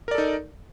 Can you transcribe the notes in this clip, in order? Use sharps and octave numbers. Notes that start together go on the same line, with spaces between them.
D#4 A4 A#4 D5